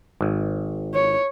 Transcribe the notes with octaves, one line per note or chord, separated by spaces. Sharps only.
G#1
C#5